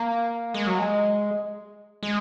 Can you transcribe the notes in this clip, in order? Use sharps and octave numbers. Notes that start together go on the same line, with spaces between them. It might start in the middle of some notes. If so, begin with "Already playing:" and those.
Already playing: A#3
G#3
F#3
G#3
G#3